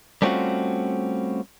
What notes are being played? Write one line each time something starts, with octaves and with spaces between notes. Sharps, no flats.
G3 A3 C4 C#4 F4 F#4